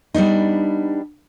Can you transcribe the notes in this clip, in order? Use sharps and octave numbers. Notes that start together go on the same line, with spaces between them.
G3 B3 D4 D#4